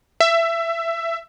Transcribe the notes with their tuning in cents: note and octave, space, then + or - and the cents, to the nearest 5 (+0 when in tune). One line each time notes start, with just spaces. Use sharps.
E5 +20